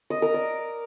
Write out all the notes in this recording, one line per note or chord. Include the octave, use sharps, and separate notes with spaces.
D#5
A#4
D5